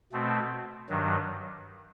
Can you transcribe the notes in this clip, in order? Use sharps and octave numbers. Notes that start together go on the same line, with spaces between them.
B2 A3 C4
G2 D#3 F#3